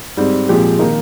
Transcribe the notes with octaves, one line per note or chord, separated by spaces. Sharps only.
G#2 G3 C4
A#2 F3 G#3 C4 G4
D#3 A#3 D#4